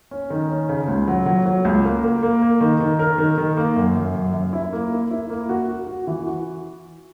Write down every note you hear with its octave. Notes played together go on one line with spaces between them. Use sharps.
C#4
D#3
C#4
C#3
C#2
F#3
F#3
F#3
C#2
A#3
A#3
A#3
A#3
D#3
D#3
A#4
D#3
D#3
A#3
F#2
F#2
F#2
F#2
E4
A#3
E4
E4
A#3
F#4
F#4
F#4
E3
F#4